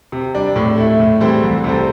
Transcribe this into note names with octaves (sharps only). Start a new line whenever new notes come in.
C3
G3 D4
A2
A3 E4
A2
E3 G3 C4 A4
C2
C3 G3 C4 A4